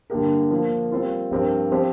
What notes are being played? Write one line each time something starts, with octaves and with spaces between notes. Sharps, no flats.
G2 D3 A#3 G4 A#4
F3 A#3 F4 A#4
G3 C4 F4 A#4
G2 F3 C4 G4 A#4
F3 C4 G4 C5